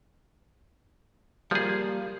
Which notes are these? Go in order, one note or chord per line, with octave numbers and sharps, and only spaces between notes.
F3 G3 A#3 G#4